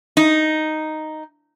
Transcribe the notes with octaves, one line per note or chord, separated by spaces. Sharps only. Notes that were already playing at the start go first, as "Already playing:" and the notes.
D#4